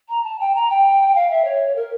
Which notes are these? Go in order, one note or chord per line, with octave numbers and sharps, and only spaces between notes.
A#5
A5
G5
A#5
G5
F5
E5
C#5
A#4